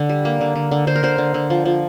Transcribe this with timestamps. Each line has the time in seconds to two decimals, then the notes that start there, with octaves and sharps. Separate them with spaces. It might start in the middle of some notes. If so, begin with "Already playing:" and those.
Already playing: D3
0.09 G3
0.25 A#3
0.41 D3
0.56 D3
0.71 D3
0.87 D3 C5
0.96 A#4
1.03 D3 C5
1.18 D3
1.34 D3
1.50 F3
1.66 F3